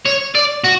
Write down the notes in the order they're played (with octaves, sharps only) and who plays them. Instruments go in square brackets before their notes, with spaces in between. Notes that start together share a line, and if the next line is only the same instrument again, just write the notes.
[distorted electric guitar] C#5
D5
F#4